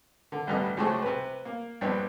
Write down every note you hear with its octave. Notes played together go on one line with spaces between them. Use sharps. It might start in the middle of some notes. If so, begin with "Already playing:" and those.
D3
A1 G2 D3 G3 B3 D#5
C#2 F#3 G#3 A3 C5 A5
C3 B4
A#3
A#1 G2 B3 D4